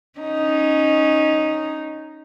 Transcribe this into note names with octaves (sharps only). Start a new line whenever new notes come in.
C#4 D#4